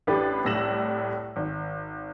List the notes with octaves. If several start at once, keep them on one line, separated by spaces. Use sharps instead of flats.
A1 D4 E4 G4 B4 A6
C2 A2 E6 A#6 E7 F#7
G#1